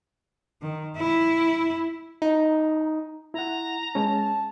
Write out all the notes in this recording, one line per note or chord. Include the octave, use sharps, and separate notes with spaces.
D#3
E4
D#4
E4 F#5 A#5
G#3 C#4 A5